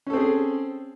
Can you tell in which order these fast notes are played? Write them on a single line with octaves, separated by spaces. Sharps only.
C#4 A4 C4 G#4